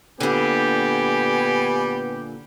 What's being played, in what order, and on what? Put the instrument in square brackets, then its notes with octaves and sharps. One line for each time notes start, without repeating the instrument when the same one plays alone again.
[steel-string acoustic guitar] A#2 D3 [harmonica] G3 G#5 [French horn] B3 [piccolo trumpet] G4